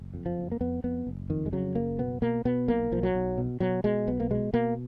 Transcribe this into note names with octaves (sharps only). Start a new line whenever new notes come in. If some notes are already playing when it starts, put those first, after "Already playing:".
Already playing: F#1
F2
F3
F#1
A#3
F2 B3
F2 B3
F#1
F2 D#3
G#3
C#3 F#3
F#1 A#3
B2 B3
B2 A#3
B2 B3
B1 A#3
B1 F3
F#3
B1
B2
B2 F#3
B2 G#3
B1 B3
A#3
B2 G#3
B2 A#3